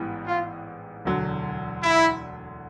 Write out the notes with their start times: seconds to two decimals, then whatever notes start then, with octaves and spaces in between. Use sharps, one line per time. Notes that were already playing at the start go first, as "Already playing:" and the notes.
Already playing: A1 G#2 E3 G3 B3
0.27 F4
1.05 E1 D2 D3 F#3
1.83 E4